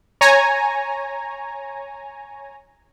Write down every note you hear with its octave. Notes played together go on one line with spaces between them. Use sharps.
C#5 G#5 A#5